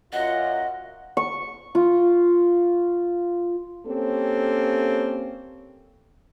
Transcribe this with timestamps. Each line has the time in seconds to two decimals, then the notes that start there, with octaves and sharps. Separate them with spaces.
0.13 F#2 F4 D#5 F#5
1.17 C#6
1.75 F4
3.86 A#3 C4 C#4 G4 A4